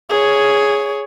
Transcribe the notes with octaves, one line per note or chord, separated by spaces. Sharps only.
G#4 C#5